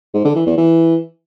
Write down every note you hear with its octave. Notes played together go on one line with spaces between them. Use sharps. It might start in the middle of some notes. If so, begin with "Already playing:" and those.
G#2
D3
E3
E2
E3